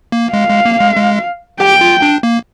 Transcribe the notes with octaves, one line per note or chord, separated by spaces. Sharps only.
A#3
G#3 F5
G#3
A#3
G#3
G#3
G4 G5
F4
D4
A#3